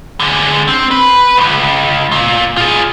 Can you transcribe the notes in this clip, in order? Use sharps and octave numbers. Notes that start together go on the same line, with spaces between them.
D3 G#3
C4
B4
C#2 G#2
A#2
F4 G#4